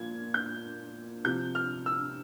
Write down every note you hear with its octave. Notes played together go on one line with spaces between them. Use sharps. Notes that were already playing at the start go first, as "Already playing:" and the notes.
Already playing: A#2 F3 G#6
G6
C3 F3 G6
F6
E6